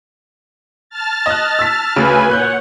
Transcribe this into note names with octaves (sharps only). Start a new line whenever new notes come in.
A5 F6 A6
D#5 F#6
E6 B6
D2 C#3 B4 G#5
A#2 C#5 F#5 F#6 G6